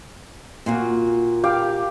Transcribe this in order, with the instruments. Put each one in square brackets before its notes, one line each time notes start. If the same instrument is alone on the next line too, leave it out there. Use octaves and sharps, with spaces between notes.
[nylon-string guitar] A#2 F4 F#4
[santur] G4 F5 G5